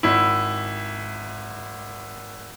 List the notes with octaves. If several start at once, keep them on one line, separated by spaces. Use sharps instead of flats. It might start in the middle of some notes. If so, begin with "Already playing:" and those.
G#1 E4